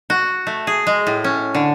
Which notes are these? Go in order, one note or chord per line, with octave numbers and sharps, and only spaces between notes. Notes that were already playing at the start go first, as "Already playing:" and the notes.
F#4
A3
G#4
G#3
A2
C#4
D3